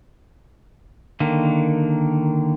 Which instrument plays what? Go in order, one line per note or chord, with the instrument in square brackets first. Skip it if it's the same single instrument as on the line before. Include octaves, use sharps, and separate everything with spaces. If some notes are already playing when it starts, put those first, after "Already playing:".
[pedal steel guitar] D3 D#3 A#3